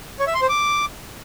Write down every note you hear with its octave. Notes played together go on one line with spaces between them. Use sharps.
C#5
E5
C6
C5
D6